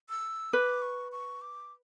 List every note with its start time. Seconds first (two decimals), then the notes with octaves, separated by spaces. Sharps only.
0.09 E6
0.53 B4 D6
0.82 C#6
1.12 C#6
1.41 D6